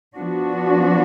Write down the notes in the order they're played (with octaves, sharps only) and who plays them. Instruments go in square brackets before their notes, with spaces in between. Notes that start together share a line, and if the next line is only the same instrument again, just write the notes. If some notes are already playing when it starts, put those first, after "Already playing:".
[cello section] F3 B3 D4 F#4